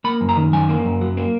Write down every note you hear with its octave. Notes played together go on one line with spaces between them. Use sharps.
A#3 B5
F#2
A#5
D#3
F#2 G#5
A#3
F#2
F#3
A#3